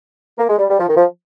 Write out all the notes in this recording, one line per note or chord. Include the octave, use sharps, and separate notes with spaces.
A#3
G#3
G3
G3
F3
D#3
F3